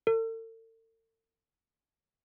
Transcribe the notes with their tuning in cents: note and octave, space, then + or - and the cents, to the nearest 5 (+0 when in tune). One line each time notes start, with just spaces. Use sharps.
A4 +45